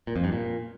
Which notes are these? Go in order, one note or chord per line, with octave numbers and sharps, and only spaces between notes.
A#2
F2
G2
A#2